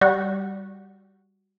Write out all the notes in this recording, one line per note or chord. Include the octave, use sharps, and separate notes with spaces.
G3 F#4